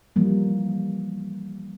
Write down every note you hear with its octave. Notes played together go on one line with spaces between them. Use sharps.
E3 F3 G3 A#3